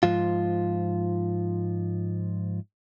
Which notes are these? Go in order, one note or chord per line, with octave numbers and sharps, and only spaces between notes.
G#2 F3 F4